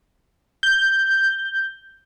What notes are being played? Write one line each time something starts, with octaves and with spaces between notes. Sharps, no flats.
G6